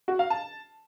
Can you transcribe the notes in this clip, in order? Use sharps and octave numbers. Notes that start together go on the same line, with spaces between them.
F#4
F5
A5